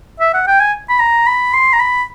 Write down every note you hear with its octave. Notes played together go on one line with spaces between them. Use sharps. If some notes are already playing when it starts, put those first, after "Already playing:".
E5
F#5
G5
G#5
B5
A#5
B5
C6
A#5
B5